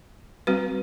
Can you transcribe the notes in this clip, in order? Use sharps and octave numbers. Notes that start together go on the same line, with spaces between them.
G3 C4 F#4 B4